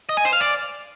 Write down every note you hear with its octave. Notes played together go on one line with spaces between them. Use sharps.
D#5
G#5
C5
F5
D5